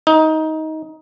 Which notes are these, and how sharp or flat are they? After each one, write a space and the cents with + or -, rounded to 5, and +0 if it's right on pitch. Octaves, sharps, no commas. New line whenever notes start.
D#4 +20